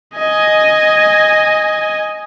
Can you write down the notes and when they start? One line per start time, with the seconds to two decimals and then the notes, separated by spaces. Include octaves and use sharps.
0.15 D#5 G#5